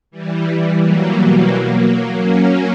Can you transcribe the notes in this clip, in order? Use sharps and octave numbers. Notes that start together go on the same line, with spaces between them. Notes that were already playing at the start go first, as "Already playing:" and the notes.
E3 G3
F#3 A#3
B2
F#3 A#3
F#3 A#3
A#3 C#4